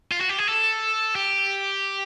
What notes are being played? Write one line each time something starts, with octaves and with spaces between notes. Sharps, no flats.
F4
F#4
G4
G#4
A4
G4